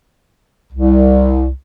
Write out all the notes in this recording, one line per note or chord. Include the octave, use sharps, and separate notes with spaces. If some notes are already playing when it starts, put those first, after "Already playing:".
C2